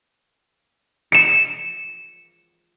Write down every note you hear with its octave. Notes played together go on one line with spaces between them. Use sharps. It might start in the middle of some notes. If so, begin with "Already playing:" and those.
C#7 E7